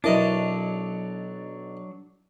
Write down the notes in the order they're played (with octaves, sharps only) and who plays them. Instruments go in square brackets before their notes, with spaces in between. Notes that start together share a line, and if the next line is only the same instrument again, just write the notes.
[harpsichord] B1 D#5 D6 [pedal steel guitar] F#3 D4 [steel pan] E4 A#4 D5